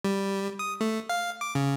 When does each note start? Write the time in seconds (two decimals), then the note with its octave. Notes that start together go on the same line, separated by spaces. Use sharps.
0.04 G3
0.59 D#6
0.81 A3
1.09 F5
1.41 D6
1.55 C#3